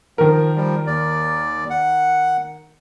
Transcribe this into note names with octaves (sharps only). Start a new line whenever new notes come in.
D#3 F3 A#4
F3 G3
D#2 D5
F#5